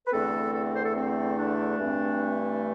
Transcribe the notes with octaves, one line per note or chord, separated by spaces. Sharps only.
B4
E2 D3 A3 C4 A4
A4
A4
C5
A4
C4
D4
G2 E3 A3 C4